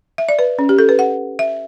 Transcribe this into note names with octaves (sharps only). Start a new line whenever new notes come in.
E5
D5
B4
C#4
G4
A4
B4
F#5
E5